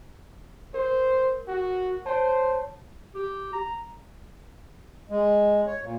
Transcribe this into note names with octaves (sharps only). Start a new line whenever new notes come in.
A#4 C5
F#4
C5 C#5 A5
G4
A#5
G#3
C#5
A#2